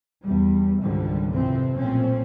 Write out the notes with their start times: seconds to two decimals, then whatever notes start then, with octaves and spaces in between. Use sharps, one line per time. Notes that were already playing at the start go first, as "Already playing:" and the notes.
0.24 E2 G3
0.81 G#1 C#2 G#2 D3 F3 G3
1.33 F2 C3 E3 F3 C4
1.78 B1 A#2 F3 A3 C4 C#4